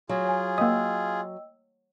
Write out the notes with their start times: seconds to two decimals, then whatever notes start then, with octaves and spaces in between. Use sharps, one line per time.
0.09 F#3 F4 G#4
0.25 C#5 G#5
0.58 A#3 D#5 G5 D#6 E6